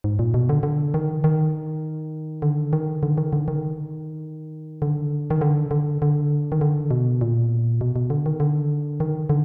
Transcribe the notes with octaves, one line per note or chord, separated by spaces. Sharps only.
G#2
A#2
B2
D3
D3
D#3
D#3
D3
D#3
D3
D#3
D3
D#3
D3
D#3
D3
D3
D3
D#3
D3
B2
A#2
B2
B2
D3
D#3
D3
D#3
D3